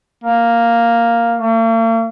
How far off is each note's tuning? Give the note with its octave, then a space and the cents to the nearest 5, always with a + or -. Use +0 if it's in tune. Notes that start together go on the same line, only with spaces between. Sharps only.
A#3 +0
A#3 -45